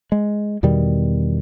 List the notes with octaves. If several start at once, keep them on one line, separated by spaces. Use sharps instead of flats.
G#3
E2 B2 D#3 G3